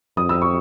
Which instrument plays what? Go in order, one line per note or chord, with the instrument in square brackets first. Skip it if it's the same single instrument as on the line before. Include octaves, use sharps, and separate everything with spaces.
[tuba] F2 [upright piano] D#6
[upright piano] E6
C#6